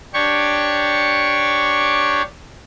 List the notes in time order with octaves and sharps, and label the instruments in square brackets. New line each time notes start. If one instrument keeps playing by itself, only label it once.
[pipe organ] D4 G4 C#5 C#6